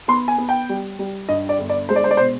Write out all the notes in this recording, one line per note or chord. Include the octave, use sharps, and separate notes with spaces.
B3 C6
G#5
B3
G5
G3
G3
G2 D#5
D5
G1
D5
G#3 C5
D5
C5
D5
B2 C5